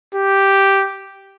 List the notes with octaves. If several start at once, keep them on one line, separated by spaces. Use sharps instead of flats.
G4